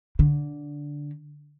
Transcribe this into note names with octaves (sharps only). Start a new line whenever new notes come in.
D3